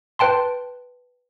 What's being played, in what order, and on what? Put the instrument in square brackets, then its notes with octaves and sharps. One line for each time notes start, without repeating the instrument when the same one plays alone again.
[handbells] B4 G5 A5 C6